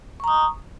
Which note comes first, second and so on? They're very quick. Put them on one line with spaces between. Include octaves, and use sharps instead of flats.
C#6 A#5 D#6